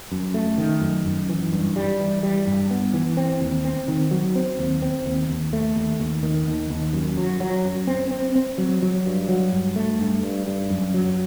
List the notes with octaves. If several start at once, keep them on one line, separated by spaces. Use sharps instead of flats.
F#2
A3
D#3
F#2
F#2
E3
G2
G3
E3
G3
G2
B3
E3
C4
D#2
C4
D#3
F#3
C4
D#2
C4
D#2
D#2
A3
D#2
D#2
D#3
D#2
D#2
F#2
F#3
F#3
F#2
C4
C4
C4
F#3
F#3
G2
F#3
G2
A3
G2
G2
G2
F#2
F#3